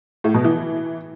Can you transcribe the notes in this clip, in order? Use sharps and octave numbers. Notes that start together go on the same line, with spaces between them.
A2
B2
E3